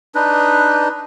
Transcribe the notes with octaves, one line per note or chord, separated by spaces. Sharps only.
D4 D#4 B4